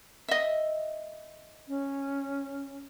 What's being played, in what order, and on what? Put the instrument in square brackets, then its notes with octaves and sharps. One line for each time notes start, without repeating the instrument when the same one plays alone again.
[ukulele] D#5 E5
[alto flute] C#4